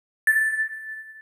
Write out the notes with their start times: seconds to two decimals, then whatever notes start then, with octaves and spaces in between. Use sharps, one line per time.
0.27 A6